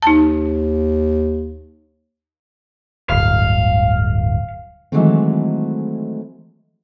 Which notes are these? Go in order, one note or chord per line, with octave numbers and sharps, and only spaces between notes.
D#2 D#4 A5
D1 G1 F5
D#3 E3 F#3 G#3 A3 C4